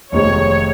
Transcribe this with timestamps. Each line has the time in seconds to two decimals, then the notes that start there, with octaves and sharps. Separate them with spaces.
0.12 F1 F2 C3 D#3 G#3 C#5